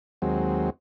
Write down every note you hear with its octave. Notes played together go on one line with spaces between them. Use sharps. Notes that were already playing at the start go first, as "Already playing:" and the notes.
D#2 F#3 G#3 C4